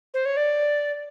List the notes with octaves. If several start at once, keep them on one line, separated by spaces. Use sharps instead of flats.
C5
C#5
D5